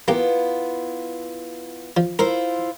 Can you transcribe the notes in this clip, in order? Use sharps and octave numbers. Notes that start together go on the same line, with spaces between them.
A#3 B3 E4 F4 G4
F3
E4 F4 A#4 C5